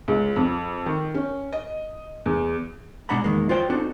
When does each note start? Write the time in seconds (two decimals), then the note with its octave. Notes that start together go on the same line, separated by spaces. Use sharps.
0.08 C#2
0.36 F2
0.86 D#3
1.14 C#4
1.53 D#5
2.26 E2
3.09 B2 G#3 D4 F#5 A#5 B5
3.24 E2 D#3 G#3 A#3
3.49 F4 F#4 C5 D5 G5
3.70 C4 D4 D#4 F#4 A4